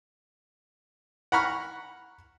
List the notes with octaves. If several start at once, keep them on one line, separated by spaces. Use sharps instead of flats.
F#5 A#5 B5 C#6 F6